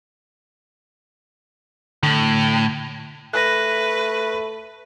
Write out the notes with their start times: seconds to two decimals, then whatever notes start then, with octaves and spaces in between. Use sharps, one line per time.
2.03 A2 D3
3.34 A3 B4 F#6 A#6